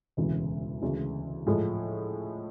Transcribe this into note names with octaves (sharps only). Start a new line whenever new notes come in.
E1 D2 C#3 E3
D2 C#3 E3 G#3
A2 F3 G#3